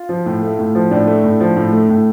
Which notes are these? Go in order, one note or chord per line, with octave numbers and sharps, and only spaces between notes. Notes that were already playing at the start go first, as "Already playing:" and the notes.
Already playing: F4
F3
A2
A3
A2
F3
A2 D4
A3
A2
F3
A2
A3
A2